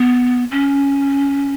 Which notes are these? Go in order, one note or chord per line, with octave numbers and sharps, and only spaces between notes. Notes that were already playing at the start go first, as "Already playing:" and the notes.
Already playing: B3
C#4